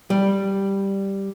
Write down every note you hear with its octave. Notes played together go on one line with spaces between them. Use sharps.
G3